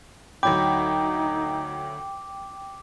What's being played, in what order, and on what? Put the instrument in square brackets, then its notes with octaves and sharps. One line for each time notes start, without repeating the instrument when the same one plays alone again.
[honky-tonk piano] D2 F#3 B5 [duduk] D#4 [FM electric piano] G5 [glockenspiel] D6